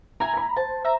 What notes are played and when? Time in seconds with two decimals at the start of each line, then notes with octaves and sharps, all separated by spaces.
0.20 E4 G#5 A#5
0.33 A#5 B5
0.56 C5 A5
0.85 E5 A#5